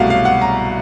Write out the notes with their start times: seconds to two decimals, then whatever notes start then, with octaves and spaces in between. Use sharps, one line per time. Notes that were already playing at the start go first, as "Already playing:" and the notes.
Already playing: C2 B2 F#3 A3 F5 F#5
0.10 F5
0.25 F#5
0.42 A#5